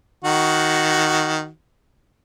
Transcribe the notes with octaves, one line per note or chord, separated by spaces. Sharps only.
D#3 F#4